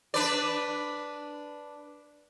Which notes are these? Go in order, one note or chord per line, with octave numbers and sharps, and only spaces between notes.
D4 B4 D5